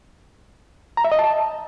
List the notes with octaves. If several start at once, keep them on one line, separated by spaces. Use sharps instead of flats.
A#5
E5
D#5
A5